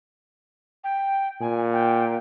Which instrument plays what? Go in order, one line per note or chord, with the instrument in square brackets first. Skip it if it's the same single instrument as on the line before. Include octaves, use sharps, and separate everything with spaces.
[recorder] G5
[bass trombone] A#2 [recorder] G#5
[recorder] G5